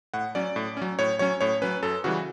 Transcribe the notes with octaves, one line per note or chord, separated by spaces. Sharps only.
A2 F#5
F#3 C#4 D5
A2
F#3 C#4
A2 C#5
F#3 C#4 C#5
A2 C#5
F#3 C#4 B4
F#2 A4
C#3 E3 G3 F#4